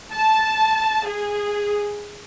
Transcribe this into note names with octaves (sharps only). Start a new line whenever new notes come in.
A5
G#4